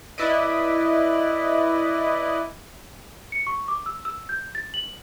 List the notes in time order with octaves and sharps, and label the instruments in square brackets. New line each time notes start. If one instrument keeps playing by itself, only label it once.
[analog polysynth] E4 B4 D5 D#5
[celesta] C#7
C#6
D6
E6
E6
G6
A6
F#7